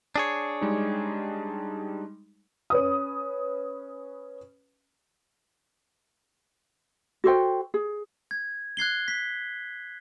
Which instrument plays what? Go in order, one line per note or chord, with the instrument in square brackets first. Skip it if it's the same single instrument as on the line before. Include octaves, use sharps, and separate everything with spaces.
[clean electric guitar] D4 G#4 C#5
[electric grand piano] G3 G#3 D#4
[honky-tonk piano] C#4 B4 D#6
[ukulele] F#4 A4 C5 G5
G#4
[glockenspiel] G#6
F#6 G#6 C7 G7
B6